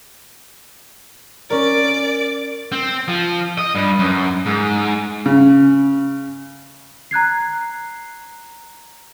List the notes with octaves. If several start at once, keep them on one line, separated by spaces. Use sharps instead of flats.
C#4 A#4 D5 D6
C4
F3
D#5
G2
F#2
G#2
C#3
A#5 F#6 G#6 C7